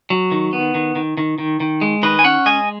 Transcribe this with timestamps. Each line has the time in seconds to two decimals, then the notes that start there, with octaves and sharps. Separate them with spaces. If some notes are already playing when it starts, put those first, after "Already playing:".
0.10 F#3
0.32 D#3
0.53 B3
0.75 D#3
0.95 D#3
1.17 D#3
1.38 D#3
1.60 D#3
1.81 G#3
2.03 D#3 B4 D#5
2.19 G#5
2.24 C#4 C#5 F#5
2.46 G#3 D#5 G#5